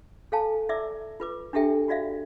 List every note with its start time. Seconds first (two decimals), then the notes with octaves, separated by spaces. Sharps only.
0.32 A4 C#5 F5 G#5 A5
0.69 E4 D5 E5 D6 E6
1.20 F4 B4 D6
1.53 D4 E4 G4 A4 E5 G5
1.88 F4 F#4 D5 E5 F5